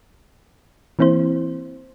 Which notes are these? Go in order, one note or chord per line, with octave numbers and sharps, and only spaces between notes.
E3 A#3 C4 E4 C5